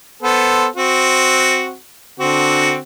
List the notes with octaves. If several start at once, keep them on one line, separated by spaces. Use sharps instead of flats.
B3 A4 C5
C4 F#4
D3 C4 F#4